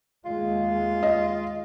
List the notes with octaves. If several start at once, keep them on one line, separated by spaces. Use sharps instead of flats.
D#2 G#3 F4
D#5